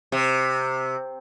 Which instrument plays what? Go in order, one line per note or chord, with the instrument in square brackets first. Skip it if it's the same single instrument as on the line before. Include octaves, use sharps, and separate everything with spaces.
[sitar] C3